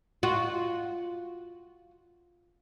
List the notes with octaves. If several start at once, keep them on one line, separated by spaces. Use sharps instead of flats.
F4 F#4